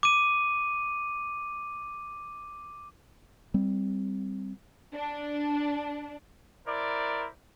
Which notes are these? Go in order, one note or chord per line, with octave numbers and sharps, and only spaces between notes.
D6 D#7
G3 C4
D4
E4 A#4 C5 D5